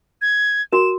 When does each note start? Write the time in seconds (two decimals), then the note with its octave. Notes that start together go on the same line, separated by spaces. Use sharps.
0.22 G#6
0.72 F#4 A#4 E7